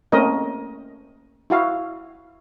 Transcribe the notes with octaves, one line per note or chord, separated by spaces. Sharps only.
A3 A#3 C4 C#4 A#4 D#5
E4 F#4 F5